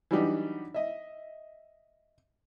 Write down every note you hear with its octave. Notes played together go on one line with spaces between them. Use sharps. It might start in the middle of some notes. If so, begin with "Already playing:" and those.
E3 F#3 G3 D4 D#4 G4
D#5 E5